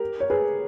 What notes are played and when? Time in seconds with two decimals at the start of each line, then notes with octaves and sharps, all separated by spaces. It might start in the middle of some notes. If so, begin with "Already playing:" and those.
Already playing: G4 A#4
0.20 C#5
0.30 G#4 B4